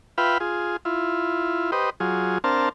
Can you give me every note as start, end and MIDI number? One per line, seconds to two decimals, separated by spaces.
0.18 0.38 65
0.18 0.38 71
0.18 0.38 76
0.18 0.38 77
0.18 0.38 79
0.18 0.38 83
0.40 0.77 65
0.40 0.77 68
0.85 1.71 64
0.85 1.71 65
1.72 1.90 67
1.72 1.90 71
1.72 1.90 72
1.72 1.90 75
2.00 2.38 54
2.00 2.38 65
2.00 2.38 68
2.44 2.69 60
2.44 2.69 62
2.44 2.69 70
2.44 2.69 72
2.44 2.69 77
2.44 2.69 81